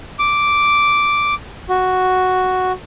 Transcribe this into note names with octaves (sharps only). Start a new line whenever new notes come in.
D6
F#4